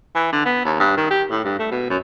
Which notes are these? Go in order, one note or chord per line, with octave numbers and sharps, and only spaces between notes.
E3
D3
B3
D#2
G2
D#3
G4
A2
G2
A3
B2
F#2